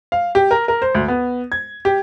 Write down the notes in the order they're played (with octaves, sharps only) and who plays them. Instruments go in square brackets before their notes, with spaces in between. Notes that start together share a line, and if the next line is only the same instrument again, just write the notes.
[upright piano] F5
G4
A#4
A#4
C5
D2
B3
G#6
G4